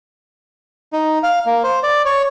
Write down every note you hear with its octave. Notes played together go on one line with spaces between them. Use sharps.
D#4
F5
A#3
C5
D5
C#5